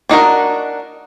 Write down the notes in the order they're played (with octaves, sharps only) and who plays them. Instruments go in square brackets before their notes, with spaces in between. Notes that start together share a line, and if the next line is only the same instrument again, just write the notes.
[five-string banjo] D4 D#4 F#4 A#4